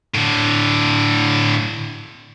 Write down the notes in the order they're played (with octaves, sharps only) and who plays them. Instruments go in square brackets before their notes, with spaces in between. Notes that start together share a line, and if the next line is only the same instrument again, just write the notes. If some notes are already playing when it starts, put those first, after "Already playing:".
[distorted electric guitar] A2 D3